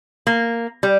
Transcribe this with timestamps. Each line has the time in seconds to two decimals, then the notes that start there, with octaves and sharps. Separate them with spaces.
0.27 A#3
0.83 G3